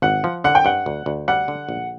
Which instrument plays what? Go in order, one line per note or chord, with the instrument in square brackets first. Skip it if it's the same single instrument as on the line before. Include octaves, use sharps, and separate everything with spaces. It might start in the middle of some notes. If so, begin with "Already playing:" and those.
[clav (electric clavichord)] G#1 [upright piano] F#5
[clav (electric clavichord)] F3
[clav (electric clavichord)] D3 [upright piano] F#5
[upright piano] G5
[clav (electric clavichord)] G2 [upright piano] F#5
[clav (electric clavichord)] D2
D2
[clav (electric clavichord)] G3 [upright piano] F#5
[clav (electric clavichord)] D3
A#1